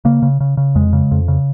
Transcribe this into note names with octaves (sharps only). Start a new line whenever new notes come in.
C#3 A#3
C#3
C#3
C#3
F2 G#3
C#3
F2
C#3